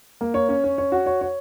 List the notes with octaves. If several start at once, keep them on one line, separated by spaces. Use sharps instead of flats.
A#3
C#5
C#4
C#4
C#5
F#4
C#5
C#5